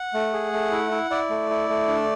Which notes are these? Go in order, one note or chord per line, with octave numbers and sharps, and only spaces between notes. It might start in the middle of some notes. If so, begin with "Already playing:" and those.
Already playing: F#5
A3
G#4
A3
E4
E4
E4 D5
A3
E4
A3
D4